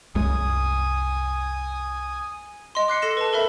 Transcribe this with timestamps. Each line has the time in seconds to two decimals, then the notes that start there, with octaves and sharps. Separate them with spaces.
0.15 C2 F#2 G#3 G#5 D#6
2.75 D#5 C6
2.88 D6 F#6 C7 C#7
3.02 A4 A#6 C#7 E7
3.17 B4 A5
3.33 A4 A#4 E5 B5